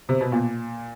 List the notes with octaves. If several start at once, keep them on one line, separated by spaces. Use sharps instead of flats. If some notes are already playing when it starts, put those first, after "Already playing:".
C3
B2
A#2